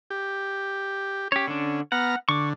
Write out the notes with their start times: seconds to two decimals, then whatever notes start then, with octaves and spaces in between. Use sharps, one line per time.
0.10 G4
1.32 C#4 G4 C#5
1.47 D3 D4
1.92 B3 F#5 A#5 F6
2.29 D3 C#6 D6